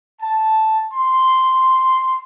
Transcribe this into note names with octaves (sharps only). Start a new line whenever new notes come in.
A5
C6